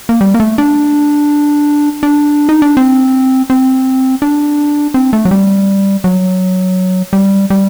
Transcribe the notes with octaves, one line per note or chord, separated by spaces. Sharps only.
A#3
G3
A#3
A3
D4
D4
D#4
D4
C4
C4
D4
C4
A3
F#3
G3
F#3
G3
G3